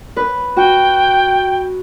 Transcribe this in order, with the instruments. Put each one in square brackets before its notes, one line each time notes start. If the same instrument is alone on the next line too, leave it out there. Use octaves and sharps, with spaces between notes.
[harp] B4
[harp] F#4 [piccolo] G5